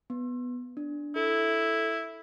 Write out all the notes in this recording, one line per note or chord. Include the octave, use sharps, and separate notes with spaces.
B3
D4
E4 A4